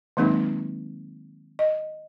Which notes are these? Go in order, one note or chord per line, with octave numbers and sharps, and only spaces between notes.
D#3 F#3 G#3 A#3 C4 D#4
D#5